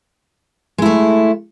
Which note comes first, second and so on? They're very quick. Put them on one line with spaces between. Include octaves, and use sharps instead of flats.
G#3 E4 A3